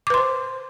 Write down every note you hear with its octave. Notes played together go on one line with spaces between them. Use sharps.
B4 C5 C6 D6